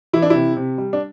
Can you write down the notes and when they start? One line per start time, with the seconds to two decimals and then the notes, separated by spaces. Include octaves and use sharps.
0.13 E3 E4
0.22 D4
0.30 C3 E4
0.57 C3
0.78 G3
0.93 D4